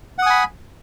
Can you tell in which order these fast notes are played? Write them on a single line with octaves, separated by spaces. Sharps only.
F#5 D#6 G#5 B5